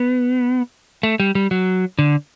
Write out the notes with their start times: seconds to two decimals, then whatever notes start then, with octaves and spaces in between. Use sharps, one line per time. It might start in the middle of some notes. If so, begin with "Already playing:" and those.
Already playing: B3
1.03 A3
1.20 G3
1.35 G3
1.51 F#3
1.99 D3